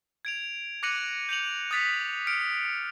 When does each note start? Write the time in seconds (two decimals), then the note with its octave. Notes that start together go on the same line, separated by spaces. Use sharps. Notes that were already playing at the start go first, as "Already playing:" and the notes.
0.25 G#6 D7 F7
0.83 D6 F#6 A#6 C#7 D#7 F#7
1.29 G6 C#7 F7 F#7
1.71 D#6 F#6 A6 B6 C#7
2.27 F6 C#7 D7